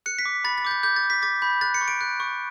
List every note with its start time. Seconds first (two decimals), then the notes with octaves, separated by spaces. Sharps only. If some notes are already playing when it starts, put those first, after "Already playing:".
0.06 F#6 C#7
0.19 B6
0.26 D6
0.44 B5 A6
0.58 A6
0.65 D6 G6
0.71 A6
0.83 D6 G6
0.96 A6
1.03 D6
1.10 B6
1.22 D6 A6
1.42 B5 G6
1.61 F#6 A6
1.74 C#7
1.81 C#6
1.88 D7
2.01 F#6
2.20 C#6